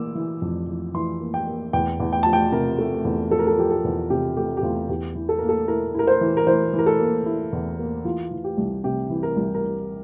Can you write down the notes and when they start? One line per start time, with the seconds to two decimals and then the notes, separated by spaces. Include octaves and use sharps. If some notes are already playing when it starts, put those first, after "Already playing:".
Already playing: E3 A#3 D6 E6
0.15 E3
0.42 F2
0.68 E3
0.94 E3 C6
1.20 A#3
1.34 G5
1.47 A#3
1.73 E2 G5
2.00 E2
2.13 G5
2.23 F3 A5
2.33 G5
2.52 C3 A#4
2.79 A3
3.05 E2
3.31 F3 A4
3.39 A#4
3.47 A4
3.57 F3 G4
3.71 A4
3.84 E2
4.10 C3 G4
4.37 A3 G4
4.57 G4
4.62 E2 F4
4.89 E2 G4
5.15 E3
5.29 A4
5.39 A#3 A#4
5.49 A4
5.68 E4 A#4
5.95 E4 A#4
6.07 C5
6.21 E3
6.37 A#4
6.47 E3 C5
6.73 E3
6.79 A#4
6.86 A4
7.00 A#3
7.26 E4
7.53 E2
7.79 A#3
8.04 E3 F4
8.31 E3
8.44 G4
8.57 C2
8.84 C3 G4
9.10 E3
9.23 A#4
9.37 C2
9.54 A#4